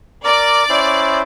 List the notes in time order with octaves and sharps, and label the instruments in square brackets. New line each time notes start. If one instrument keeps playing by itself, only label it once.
[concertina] A#4 D6 [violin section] D5
[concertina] C#4 E4 C5